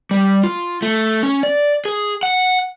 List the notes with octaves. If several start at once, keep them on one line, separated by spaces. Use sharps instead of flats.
G3
F4
A3
C#4
D5
G#4
F#5